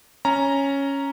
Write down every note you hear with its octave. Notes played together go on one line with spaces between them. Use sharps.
C#4 A#5